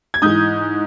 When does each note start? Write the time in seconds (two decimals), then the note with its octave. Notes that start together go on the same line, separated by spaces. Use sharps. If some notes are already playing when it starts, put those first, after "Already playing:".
0.14 G#6
0.22 G#2 E3 D#6 G6